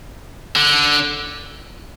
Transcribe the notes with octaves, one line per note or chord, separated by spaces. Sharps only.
D3